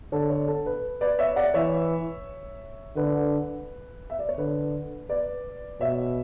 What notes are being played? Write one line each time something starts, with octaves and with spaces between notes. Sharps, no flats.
D3 A4 C#5
A4 C#5
A4
B4
B4 D5
C#5 E5
D5 F#5
E3 C#5 E5
D3 B4
E5
D5
C#5
D3 B4
B4 D5
B2 C#5 E5